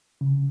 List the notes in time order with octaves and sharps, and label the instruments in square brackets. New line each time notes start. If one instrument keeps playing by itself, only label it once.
[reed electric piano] C#3